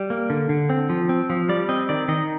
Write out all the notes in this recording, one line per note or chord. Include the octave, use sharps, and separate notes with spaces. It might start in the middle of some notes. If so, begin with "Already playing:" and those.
Already playing: G3
A#3
D3
D3
C4
F3
C4
F3
G3 D5
C4 D#5
D#3 D5
D#3 D#5